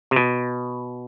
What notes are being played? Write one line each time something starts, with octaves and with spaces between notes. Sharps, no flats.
C3
B2